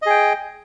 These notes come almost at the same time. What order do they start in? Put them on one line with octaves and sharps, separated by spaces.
D#5 G#4 G5